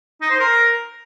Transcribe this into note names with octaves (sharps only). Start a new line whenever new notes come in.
D#4
C5
A#4